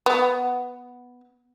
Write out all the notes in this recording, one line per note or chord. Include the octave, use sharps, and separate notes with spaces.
B3